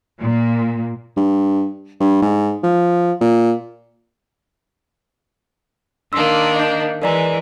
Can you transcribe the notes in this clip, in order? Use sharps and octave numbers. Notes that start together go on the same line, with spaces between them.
A#2
G2
G2
G#2
F3
A#2
D#3 A#3 D4 C6 E6
D#5 G6
E3 G#3 A#4 D5 A#5